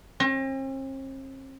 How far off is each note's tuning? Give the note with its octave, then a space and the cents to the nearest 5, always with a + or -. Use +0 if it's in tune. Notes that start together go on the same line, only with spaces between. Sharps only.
C4 +45